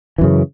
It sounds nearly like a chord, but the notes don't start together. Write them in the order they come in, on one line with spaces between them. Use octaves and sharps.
E3 F#2 C#3